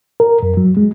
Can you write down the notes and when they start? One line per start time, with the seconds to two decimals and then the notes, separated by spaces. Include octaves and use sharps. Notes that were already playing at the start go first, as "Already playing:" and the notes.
0.20 A#4
0.43 F#2
0.57 F#3
0.77 G#3